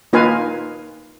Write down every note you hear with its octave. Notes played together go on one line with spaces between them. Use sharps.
A#3 D#4 F4 B4 F5 G#5